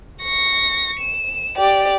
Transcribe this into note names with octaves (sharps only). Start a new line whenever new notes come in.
C#6 A#6
E7
G4 D5